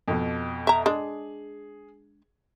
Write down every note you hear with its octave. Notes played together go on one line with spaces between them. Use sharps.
F2 B2
E5 A#5
G#3 D4 G#4